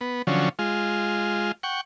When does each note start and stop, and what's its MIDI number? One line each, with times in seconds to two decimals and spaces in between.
0.01 0.22 59
0.27 0.49 50
0.27 0.49 53
0.27 0.49 54
0.27 0.49 61
0.59 1.52 56
0.59 1.52 65
1.63 1.81 78
1.63 1.81 79
1.63 1.81 85